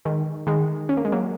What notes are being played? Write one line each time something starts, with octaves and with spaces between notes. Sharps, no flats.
D#3 G#3
D#3 G#3
C#4
A#3
G#3
F#3 A#3